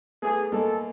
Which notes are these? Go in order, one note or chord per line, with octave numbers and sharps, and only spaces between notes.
A3 B3 G#4
G#3 A#3 A4